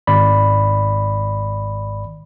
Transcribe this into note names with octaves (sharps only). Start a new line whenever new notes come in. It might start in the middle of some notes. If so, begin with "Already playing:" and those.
G#1 D5 B5